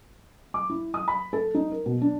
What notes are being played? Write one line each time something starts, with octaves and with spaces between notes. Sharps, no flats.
D6
E4
D#6
B5
A4
D#4
A#4
B2
D4